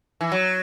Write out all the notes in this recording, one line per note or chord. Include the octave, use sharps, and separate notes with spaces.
E3
F#3